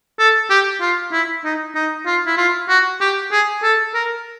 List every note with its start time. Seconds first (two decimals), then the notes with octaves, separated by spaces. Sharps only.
0.19 A4
0.50 G4
0.81 F4
1.12 E4
1.44 D#4
1.75 D#4
2.06 F4
2.26 E4
2.38 F4
2.69 F#4
3.01 G4
3.32 G#4
3.63 A4
3.94 A#4